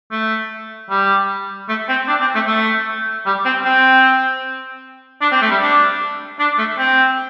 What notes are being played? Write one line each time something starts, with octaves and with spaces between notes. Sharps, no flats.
A3
G3
A3
C4
D4
C4
A3
A3
G3
C4
C4
D4
C4
A3
G3
D4
D4
A3
C4